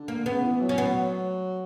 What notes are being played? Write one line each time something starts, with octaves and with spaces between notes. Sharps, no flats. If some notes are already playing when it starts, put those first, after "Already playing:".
Already playing: D3
A#3
C#3 B3
E3
F#3
C#4
B3